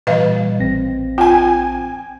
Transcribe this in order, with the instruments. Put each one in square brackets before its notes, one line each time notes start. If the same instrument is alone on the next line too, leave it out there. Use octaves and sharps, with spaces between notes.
[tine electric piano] A#2 E3 G3 [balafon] B4 D#5 F5
[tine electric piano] A1 C4 A#6
[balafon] F4 [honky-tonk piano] G5 G#5